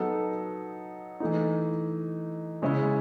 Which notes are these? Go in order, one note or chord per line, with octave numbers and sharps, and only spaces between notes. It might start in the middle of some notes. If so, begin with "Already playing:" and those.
Already playing: F#3 B3 D#4 A4
E3 A3 D#4
C#3 G#3 C#4 E4